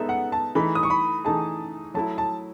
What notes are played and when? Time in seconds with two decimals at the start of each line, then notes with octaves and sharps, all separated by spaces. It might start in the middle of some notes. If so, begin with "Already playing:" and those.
Already playing: G#3 B3 D#4 A4 E5
0.09 F#5
0.32 A5
0.55 E3 A3 D#4 G#4 B5
0.75 D#6
0.83 C#6
0.90 B5
1.25 E3 A3 D#4 G#4 A5
1.94 F#3 A3 E4 A5
2.18 A5